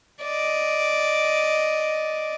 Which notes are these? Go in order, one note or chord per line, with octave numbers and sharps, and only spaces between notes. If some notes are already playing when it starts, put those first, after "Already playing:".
D5 D#5